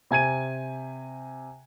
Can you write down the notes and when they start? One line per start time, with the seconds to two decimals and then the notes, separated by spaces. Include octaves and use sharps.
0.11 C3 G#5 G#6 D#7